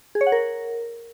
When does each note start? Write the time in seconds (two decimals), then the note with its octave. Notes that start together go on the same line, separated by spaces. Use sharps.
0.15 G#4
0.21 C#5
0.27 F#5
0.32 A#4